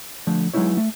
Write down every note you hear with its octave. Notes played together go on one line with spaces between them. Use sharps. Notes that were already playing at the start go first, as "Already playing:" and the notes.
D3 F3 A3
F#3 G#3 B3 D#4 E4 C#5
A3